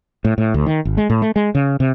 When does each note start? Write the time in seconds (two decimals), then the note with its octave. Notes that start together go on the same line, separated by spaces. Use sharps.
0.25 A2
0.38 A2
0.54 D2
0.66 D#3
0.85 G#1
0.97 G#3
1.10 A2
1.22 A3
1.36 G#3
1.55 C#3
1.80 C3